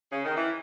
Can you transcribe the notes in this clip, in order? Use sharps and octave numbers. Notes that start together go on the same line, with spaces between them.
C#3
D#3
E3